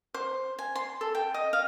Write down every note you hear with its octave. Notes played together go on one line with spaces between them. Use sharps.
C5
G#5
C6
A4
G5
D#5
F5